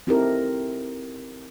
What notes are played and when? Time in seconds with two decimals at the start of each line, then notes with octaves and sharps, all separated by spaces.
0.07 C4 D#4 E4 G4 A4 A#4